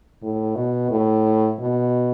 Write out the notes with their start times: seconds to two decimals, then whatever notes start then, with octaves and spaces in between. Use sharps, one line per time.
0.23 A2
0.56 B2
0.91 A2
1.59 B2